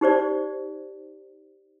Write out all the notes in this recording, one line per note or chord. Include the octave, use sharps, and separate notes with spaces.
D#4 G4 C5 D5